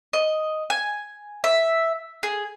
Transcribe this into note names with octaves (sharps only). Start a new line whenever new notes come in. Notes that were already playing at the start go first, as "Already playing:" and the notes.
D#5
G#5
E5
G#4